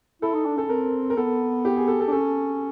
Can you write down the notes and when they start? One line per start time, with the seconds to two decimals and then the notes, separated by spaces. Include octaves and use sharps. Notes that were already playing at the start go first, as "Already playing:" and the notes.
0.22 E4 A4
0.34 D#4
0.45 D4
0.57 C#4 A4
0.69 C4 A#4
1.10 A#4
1.16 B3 A4
1.65 G4
1.77 G#4
1.88 A4
2.00 A4
2.08 D4
2.12 C#4 A4